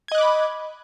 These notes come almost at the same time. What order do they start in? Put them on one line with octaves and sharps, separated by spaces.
G#6 D#5 F#6 D6 B5